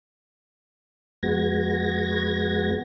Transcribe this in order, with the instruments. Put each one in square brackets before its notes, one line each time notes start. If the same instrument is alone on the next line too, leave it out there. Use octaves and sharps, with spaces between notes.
[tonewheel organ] F2 G#3 B3 F#4 G#6 A#6